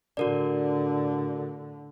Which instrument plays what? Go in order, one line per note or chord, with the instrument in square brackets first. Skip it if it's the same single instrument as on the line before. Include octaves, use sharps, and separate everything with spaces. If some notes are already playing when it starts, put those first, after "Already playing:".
[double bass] A2 D3 [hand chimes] F#4 A#4 D5